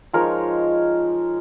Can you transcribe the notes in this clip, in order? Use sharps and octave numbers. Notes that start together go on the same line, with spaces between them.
F3 G#3 D#4 A#4 C#5